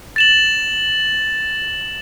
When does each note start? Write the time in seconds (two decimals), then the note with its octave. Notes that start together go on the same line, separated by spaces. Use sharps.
0.16 A6 E7 F#7